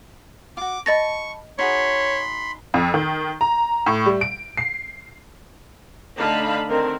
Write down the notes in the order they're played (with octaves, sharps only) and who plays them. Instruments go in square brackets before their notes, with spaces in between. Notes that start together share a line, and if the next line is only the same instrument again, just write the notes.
[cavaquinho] F4 F#4 [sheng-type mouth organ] D6
[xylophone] D#5 A6 A#6 [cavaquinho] A5 B5 [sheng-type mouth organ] C#6
[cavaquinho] D#4 F#4 G#4 [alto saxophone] C#5 [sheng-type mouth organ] B5 C6
[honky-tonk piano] F2
D#3
A#5
A2
G3
D7
C7
[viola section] D3 A3 D#4 F5 A5 B5
D3 D#3 C4 A#4